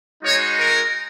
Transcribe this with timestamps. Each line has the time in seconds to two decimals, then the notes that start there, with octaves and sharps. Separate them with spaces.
0.23 G#3 D#4 F#4 C#5
0.59 A#4